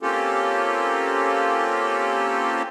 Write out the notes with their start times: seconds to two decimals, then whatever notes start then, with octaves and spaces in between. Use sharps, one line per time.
0.02 A#3 C4 C#4 F4 G4 A4